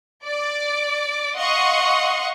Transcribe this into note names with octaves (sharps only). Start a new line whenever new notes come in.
D5 D6
D#5 F5 F#5 C6 C#6 D#6